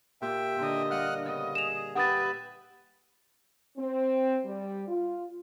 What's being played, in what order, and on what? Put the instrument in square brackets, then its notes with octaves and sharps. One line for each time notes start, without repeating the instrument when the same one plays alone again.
[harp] A#2 G4 [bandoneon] E5 G5
[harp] A#2 D3 [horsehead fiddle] D4 D#5
[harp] G3 F5 [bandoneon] F#5 F6 F#6
[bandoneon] C#3 B3 [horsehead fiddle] D#5
[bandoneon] G#4 [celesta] E7 F7
[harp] G4 [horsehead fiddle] B4 E5 [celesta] F#5 D#6 A6 [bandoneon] G5
[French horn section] C4
G3
F4